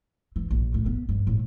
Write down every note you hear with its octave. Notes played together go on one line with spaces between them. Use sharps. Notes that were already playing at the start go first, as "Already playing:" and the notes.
E3
A#1
A2
B3
G2
A2